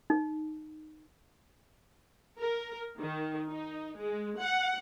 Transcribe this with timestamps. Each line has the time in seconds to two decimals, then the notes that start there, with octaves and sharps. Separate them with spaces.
0.10 D#4
2.39 A#4
2.99 D#3
3.49 D#4
3.98 G#3
4.39 F#5